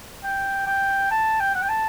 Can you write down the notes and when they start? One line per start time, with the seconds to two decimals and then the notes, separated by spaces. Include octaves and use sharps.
0.24 G5
0.67 G5
1.11 A5
1.40 G5
1.55 F#5
1.62 G5
1.69 A5